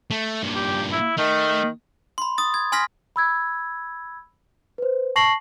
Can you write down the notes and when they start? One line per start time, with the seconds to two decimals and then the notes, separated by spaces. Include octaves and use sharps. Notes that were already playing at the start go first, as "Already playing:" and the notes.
0.11 A3
0.42 G2 A#2
0.56 G4
0.92 E4
1.18 D#3 A3
2.18 B5 C6
2.38 D#6 A6
2.54 G#6
2.72 G#5 C6 F6 A#6 B6
3.16 B5 E6 G#6
4.78 B4 C5
5.16 A5 C#6 A#6 C7 F#7